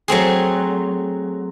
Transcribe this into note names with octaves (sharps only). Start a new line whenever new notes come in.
F#3 A3 C4 G#4